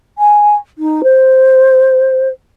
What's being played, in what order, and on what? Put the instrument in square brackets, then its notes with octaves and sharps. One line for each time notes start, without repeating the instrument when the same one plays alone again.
[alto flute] G#5
D#4
C5